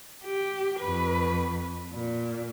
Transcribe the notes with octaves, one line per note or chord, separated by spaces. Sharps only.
G4
F2 B4
A#2